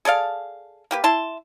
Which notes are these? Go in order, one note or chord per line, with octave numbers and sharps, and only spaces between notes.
G#4 A4 D5 F5
A#3 G4 B4
E4 A5 C6